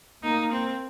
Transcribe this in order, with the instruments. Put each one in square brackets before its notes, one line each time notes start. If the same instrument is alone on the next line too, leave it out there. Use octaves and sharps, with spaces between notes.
[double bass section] A#3 [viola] D#4
[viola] C4